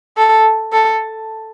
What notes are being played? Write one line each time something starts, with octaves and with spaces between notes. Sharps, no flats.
A4
A4